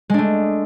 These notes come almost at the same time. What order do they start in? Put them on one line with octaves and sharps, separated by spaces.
G#3 D4 A3